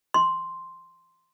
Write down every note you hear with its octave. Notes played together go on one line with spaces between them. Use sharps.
C6